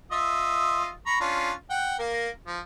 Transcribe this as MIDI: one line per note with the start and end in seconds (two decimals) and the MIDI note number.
0.11 0.90 65
0.11 0.90 75
0.11 0.90 76
1.06 1.17 82
1.06 1.17 83
1.06 1.17 85
1.20 1.52 61
1.20 1.52 62
1.20 1.52 65
1.70 1.96 78
1.70 1.96 79
1.99 2.29 58
1.99 2.29 70
2.47 2.59 53